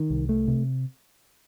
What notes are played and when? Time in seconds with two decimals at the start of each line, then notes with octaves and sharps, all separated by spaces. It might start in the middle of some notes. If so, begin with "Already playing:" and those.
Already playing: D#3
0.10 C2
0.29 A3
0.48 C3